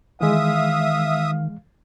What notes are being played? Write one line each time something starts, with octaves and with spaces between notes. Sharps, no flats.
D#3 E3 G#3 E5 F5 D#6